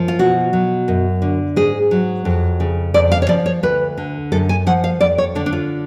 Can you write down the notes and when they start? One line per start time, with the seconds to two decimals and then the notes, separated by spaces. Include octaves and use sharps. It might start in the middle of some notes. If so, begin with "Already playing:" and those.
Already playing: F#2 F3
0.08 F4
0.19 B2 F#4
0.53 F#3
0.88 F#2
1.22 D3
1.56 G#2 G#4
1.91 F#3
2.25 F2
2.60 C#3
2.94 F2 D5
3.12 F5
3.22 C#5
3.29 F3 D5
3.46 C#5
3.63 D2 B4
3.97 D3
4.32 F#2 A4
4.49 G#5
4.66 F3 F#5
4.84 F5
5.01 F2 D5
5.18 C#5
5.35 D3 D4
5.46 D4
5.53 F4